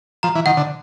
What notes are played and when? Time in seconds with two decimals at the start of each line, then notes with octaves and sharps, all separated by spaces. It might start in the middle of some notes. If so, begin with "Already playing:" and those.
0.23 F3 A#5
0.35 E3
0.46 D#3 F#5
0.57 D3